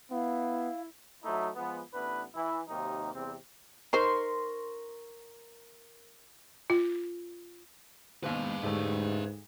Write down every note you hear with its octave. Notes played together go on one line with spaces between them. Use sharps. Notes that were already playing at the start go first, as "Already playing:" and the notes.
B3 E4 F5
F#3 A3 D#4 E4
F3 G#3 B3
A1 B3 D4 E4 B4
E3 E4
D#2 C3 F#3 A#3 D#4
E2 C3 G3 C4
D#4 A#4 C5 C6 C#6 D7
F4
D#2 G#2 B2 B4 F5
D2 G#2 G3 A3